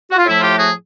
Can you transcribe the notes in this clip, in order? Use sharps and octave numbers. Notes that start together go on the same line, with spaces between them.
F#4
F4
A2 F3 A3 E4
F4 G4
F#4 G#4